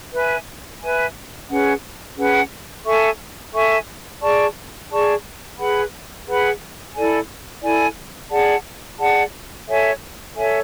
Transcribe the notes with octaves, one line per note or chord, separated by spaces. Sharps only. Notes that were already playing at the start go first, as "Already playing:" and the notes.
B4 E5 G#5
B4 E5 G#5
C#4 G#4 B4 F#5
C#4 G#4 B4 F#5
A4 E5 G#5 C#6
A4 E5 G#5 C#6
G#4 D5 A5 C#6
G#4 D5 A5 C#6
G#4 B4 F#5 B5
G#4 B4 F#5 B5
E4 A4 D5 G#5
E4 A4 D5 G#5
G#4 D5 F#5 A5
G#4 D5 F#5 A5
A4 C#5 E5 G#5
A4 C#5 E5 G#5